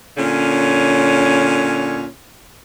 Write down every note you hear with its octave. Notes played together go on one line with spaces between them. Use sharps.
A#2 D3 C#4